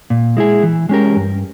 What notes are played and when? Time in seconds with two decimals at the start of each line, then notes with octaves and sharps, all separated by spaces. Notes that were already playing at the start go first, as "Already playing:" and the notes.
0.10 A#2
0.37 G#3 E4 G#4
0.63 E3
0.89 G#3 C#4 G4 A#4
1.16 G2